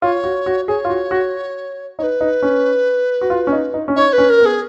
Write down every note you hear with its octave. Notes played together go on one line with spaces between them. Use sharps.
F4 C#5
F#4
F#4
G#4 C#5
F4
F#4
F#4
D#4 C#5
B4
D#4
C#4
F#4
F4
C#4
D#4
D#4
C#4
D#4 C#5
B4
C#4
A#4
B3
G#4